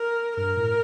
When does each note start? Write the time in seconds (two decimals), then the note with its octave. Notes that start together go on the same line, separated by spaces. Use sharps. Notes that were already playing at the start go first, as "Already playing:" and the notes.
Already playing: A#4
0.37 G2 A#4
0.57 A2